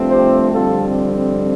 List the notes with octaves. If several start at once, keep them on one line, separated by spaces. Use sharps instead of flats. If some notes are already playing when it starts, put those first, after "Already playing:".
Already playing: G2 F3 A3 C4
G4 C5
F2 D3 G3 C4 F4 A4